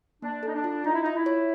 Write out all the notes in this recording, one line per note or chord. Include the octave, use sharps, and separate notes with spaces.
A#3 D4
D#4 A4
D4
F4
D#4 F4
E4
D#4 E5
E4
C#5